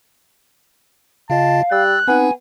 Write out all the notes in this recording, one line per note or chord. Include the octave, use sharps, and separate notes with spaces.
C#3 F4 D#5 F5 A5
G3 E6 F#6 A6
B3 C4 D#4 G#5